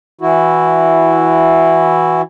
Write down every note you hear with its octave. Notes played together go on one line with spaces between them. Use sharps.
E3 E4 F#4